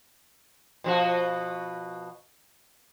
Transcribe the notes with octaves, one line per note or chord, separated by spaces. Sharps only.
B2 F3 F#4